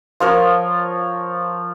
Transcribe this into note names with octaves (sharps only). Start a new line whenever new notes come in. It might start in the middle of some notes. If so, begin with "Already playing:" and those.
F3 A#4 C#5